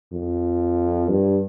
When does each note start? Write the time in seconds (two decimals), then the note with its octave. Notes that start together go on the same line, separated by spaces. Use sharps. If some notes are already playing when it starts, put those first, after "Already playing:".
0.13 F2
1.10 G2